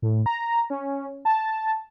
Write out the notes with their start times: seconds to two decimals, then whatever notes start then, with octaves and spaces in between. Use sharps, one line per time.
0.02 A2
0.26 A#5
0.70 C#4
1.25 A5